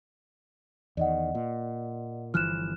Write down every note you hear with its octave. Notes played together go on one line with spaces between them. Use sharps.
E2 D#3 D5 D#5 F#5
A#2
G1 E3 F3 F6 F#6 E7